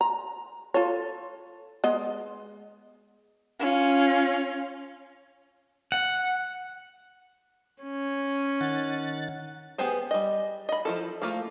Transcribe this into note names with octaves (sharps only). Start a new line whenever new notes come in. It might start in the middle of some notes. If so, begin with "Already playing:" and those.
A#5
F4 A4 C#5
G#3 B3 D#5
C#4 F4
F#5
C#4
D#3 F#5 A6
B3 G4 G#4 C5 G#5
G3 D#5
D#5 B5
F3 E4 A4
F3 A3 A#3 F4